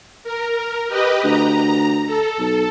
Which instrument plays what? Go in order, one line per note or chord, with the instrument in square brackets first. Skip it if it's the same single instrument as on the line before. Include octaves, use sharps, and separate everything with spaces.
[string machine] A#4
G4 B4 D#5
[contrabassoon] D2 [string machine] A#5
[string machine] A4
[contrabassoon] B1